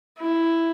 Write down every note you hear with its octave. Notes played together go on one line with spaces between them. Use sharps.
E4